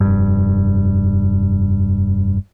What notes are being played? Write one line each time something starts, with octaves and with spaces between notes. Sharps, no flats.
F1 G2